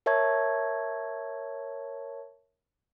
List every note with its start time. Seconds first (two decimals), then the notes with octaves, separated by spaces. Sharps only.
0.06 A#4 C#5 E5 A5 C#6 G#6